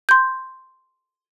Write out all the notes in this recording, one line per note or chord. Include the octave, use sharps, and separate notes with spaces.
C6 G6